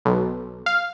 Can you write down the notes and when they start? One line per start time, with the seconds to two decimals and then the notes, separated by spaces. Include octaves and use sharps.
0.05 B1
0.66 F5